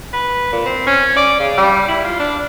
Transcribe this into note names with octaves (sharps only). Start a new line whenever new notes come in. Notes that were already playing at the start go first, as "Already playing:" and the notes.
B4
A#2
C4
C#4
D5
C#3
G3
E4
F4
D4